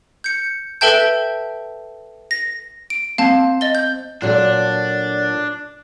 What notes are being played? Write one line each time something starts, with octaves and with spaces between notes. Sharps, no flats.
G6 C#7
A4 B4 E5 G5 A5 G6
A#6
D7
C4 F5 A5
D#5 A6 G7
G6
A#2 F#3 D4 A4